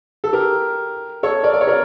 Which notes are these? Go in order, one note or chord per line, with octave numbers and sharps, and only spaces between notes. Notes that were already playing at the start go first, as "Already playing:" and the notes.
A4
G4 A#4
A4 C#5
A#4 D5
D5
C#5
A#4 D5